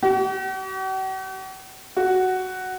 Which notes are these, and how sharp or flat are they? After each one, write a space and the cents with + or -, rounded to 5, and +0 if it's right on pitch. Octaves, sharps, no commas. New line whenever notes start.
F#4 +45
F#4 +5